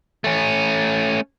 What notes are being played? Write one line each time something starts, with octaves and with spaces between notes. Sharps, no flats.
A3 C#4